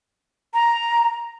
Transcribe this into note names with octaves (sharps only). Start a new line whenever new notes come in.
A#5